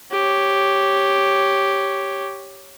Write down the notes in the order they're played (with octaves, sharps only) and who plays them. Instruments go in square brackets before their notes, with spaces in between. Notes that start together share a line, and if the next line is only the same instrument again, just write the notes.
[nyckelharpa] G4 C#5